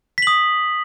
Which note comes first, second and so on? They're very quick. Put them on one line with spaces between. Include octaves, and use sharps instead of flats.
B6 F#7 D#6